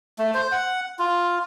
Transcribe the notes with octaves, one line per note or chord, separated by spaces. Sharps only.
A3
C5
F#5
F4